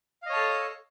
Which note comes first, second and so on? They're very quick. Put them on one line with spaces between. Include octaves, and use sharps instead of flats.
F5 D#5 C#5 A5 A4